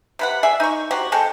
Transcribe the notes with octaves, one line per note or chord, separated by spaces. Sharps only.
C3 B4 F#5
G#4 D5 E5
D#4 C#6
F#3 C4 F#4 G4
G#3 C4 A4 G5